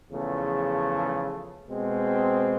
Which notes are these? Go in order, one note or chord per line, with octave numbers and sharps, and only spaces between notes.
E2 C#3 F3 A3
B2 G#3 C4